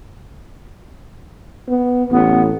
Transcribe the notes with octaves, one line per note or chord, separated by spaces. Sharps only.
B3
A1 B3